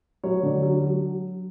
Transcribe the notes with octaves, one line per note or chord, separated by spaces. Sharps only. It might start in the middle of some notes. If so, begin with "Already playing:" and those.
F#3 C#5
D3
F#3
F#3